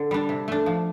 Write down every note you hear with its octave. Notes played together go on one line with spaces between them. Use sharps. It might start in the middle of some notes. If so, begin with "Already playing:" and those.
Already playing: D3
G3 D4
C3
A3 D4
F3